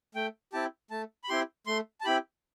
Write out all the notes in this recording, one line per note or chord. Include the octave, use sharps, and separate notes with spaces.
A3 G5
C4 E4 G4 A5
A3 A5
B5
C4 E4 G4 C6
A3 C6
A5
C4 E4 G4 B5